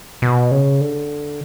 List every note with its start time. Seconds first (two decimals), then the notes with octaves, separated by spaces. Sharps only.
0.22 B2
0.51 C#3
0.81 D3